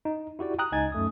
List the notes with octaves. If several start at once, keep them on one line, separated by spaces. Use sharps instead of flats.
D#4
E4 F#4 G4 D5
G5 A#5 D#6 F#6
C#2 D#4 G#5 G#6 A6
F#2 A3 D#6